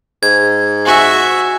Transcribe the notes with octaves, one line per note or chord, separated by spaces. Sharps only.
G#2 G#6
F#4 E5 G#5